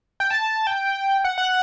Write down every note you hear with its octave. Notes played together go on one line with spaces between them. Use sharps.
G5
A5
G5
F#5
F#5